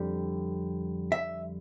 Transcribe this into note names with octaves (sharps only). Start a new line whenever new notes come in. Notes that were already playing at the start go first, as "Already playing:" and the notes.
Already playing: F2 D3 G3
E5